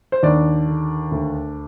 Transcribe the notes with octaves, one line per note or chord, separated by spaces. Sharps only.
C5
D#2 D4 D5
D3
D2